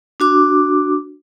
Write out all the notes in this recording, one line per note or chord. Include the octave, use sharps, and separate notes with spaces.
D4 F#4 D6